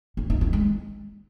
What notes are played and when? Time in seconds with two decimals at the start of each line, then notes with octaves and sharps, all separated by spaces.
0.17 C#4
0.30 D#4
0.41 C4
0.53 G#3